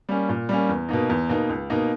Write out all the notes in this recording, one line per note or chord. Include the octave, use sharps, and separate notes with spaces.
G3 A#3 C#4
A#2
G3 A#3 C#4
E2
B2 A#3 D#4
E2
B2 A#3 D#4
C#2
B2 A#3 D#4